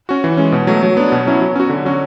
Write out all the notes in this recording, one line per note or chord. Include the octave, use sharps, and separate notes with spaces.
C#4 F#4
E3
G#3 C#4
B2
F#3 A3
F#3
B3 D4
B2
F#3 C#4 E4
F#3
C#4 F#4
D3
F#3 C#4 F#4